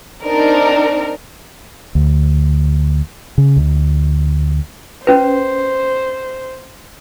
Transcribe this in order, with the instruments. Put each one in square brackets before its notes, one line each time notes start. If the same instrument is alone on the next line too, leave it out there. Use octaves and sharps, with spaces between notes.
[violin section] C4 D4 D#4 A#4
[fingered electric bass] D2
C#3
D2
[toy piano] C#4 B4 [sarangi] C5